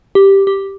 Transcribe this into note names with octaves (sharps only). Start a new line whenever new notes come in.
G4
G4